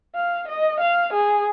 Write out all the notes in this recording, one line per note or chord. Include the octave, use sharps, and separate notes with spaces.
F5
D#5
F5
G#4